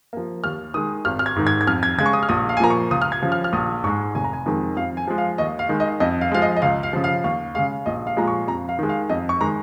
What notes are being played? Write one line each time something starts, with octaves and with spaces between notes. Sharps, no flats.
F3 A#3
D#2 F6
D#3 G#3 D#6
G#1 F6
F6
G#6
G#2 D#3
G#6
G#6
F2 F6
G#6
C#3 G#3 G#6
C#6
D#6
F6
A#1 D#6
F5
G#5
A#2 F3 A#3 A#5
C#6
C#2 D#6
F6
G#6
C#3 F3
F6
F6
A#1 D#6
G#2 G#3 C#6
F1 G#5
A#5
G#5
F2 D#3 G#3
F2 F5
G#5
F3 G#3
F5
D#2 D#5
F5
D#3 G#3
D#5
F2 D#5
F5
F3 G#3 F5
D#5
D#5
C#2 F5
F5
C#3 F3
F5
D#2 F5
C#3 G#3 F5
A#1 D#5
F5
A#2 F3 G#3 A#5
C#6
F2 A#5
F5
D#3 G#3
F5
F2 D#5
C#6
D#3 G#3 A#5